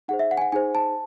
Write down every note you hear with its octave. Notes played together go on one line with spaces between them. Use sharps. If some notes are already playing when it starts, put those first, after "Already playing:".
D#4 G#4 C5 F#5
E5
F#5
G#5
F#5
D#4 G#4 C5 G#5
A5